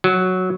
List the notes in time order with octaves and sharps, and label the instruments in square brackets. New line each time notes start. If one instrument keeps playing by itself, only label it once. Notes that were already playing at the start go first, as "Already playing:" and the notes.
[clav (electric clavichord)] F#3